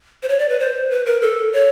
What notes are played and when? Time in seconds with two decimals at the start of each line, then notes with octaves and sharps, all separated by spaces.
0.23 C5
0.29 C#5
0.39 D5
0.49 B4
0.60 C5
0.90 B4
1.06 A#4
1.22 A4
1.53 C#5